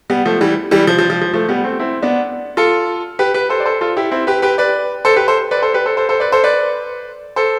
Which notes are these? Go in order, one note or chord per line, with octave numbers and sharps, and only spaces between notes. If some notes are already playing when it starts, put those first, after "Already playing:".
G3 B3
F3 A3
E3 G3
E3 G3
F3
F3
F3
F3
F3 A3
G3 B3
A3 C4
C4 E4
B3 D4
F4 A4
G4 B4
G4 B4
A4 C5
D5
A4 C5
F4 A4
E4 G4
C4 E4
G4 B4
G4 B4
B4 D5
A4 C5
G4 B4
A4 C5
B4 D5
A4 C5
G4 B4
A4 C5
A4 C5
A4 C5
B4 D5
A4 C5
B4 D5
A4 C5